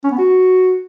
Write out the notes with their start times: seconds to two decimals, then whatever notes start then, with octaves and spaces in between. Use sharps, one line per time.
0.04 C#4
0.11 B3
0.18 F#4